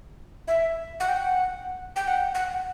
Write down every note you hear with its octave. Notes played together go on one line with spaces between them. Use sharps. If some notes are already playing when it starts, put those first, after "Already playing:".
E5
F#5
G5
F#5
G5
F#5
F#5